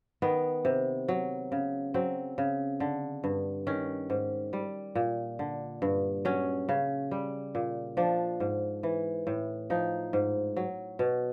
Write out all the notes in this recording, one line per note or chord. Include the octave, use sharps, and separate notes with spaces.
D#3 B3
C3
F#3
C#3
F#3 C4
C#3
D3
G2
D#3 C#4
G#2
G3
A#2
D3
G2
F#3 C#4
C#3
G3
A#2
F3 D4
G#2
E3
A2
F3 D#4
G#2
F#3
B2